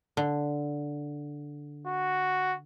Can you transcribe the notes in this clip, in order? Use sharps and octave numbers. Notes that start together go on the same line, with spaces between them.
D3
F#4